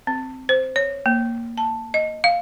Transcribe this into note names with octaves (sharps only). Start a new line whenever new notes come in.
C4
C5
C#5
A#3
A5
D#5
F5